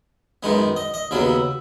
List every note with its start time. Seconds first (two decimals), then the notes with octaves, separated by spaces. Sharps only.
0.43 F#2 D#3 G#3 B3
0.76 D#5
0.94 D#5
1.11 D#2 C#3 F#3 B3 E5